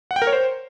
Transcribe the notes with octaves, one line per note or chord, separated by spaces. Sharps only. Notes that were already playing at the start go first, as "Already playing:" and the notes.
F#5
G5
A#4
C#5
C5